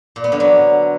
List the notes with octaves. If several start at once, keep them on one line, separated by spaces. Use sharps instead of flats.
A#2
B3
D3
F#3